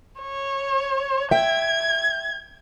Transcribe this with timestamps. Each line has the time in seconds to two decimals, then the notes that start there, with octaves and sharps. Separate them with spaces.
0.20 C#5
1.31 E5 G5 G#6